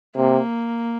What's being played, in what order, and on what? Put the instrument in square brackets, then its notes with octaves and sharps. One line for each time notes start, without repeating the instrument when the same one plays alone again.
[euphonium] C3 [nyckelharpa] A#3